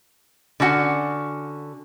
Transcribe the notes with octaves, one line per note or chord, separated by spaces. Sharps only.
D3 C#4 F#4 F#5